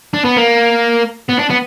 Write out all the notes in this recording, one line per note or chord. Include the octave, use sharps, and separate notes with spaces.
D4
B3
A#3
B3
D4
B3